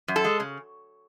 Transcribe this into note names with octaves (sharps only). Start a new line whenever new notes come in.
F#2
A4
G#3
C#3